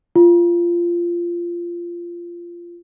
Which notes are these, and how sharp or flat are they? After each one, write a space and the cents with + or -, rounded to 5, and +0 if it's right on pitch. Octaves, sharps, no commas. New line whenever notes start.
F4 -15